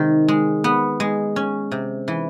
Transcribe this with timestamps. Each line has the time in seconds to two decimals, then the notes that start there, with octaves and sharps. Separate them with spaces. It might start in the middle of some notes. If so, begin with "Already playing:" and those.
Already playing: C3 D#3 G#3
0.28 G#3
0.64 B3
1.00 G#3
1.36 C#4
1.71 C3
2.08 E3